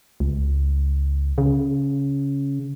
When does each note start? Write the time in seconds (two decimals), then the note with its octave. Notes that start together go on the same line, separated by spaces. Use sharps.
0.20 C#2
1.38 C#3